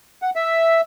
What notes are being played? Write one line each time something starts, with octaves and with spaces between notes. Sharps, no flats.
F#5
E5